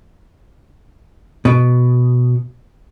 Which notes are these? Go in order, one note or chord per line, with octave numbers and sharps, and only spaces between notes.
B2